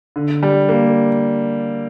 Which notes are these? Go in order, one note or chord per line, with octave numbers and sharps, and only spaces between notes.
D3
G3
A#3